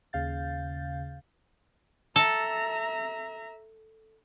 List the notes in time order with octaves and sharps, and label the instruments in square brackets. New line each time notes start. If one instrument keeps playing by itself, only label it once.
[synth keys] D#2 C#3 F5 G6 A6
[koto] A4 [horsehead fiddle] E5 A#5